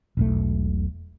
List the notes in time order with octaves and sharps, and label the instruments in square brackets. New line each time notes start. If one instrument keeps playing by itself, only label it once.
[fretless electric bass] E1 B1 A3